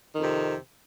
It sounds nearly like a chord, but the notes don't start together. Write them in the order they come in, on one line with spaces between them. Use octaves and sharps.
D#3 F2 C3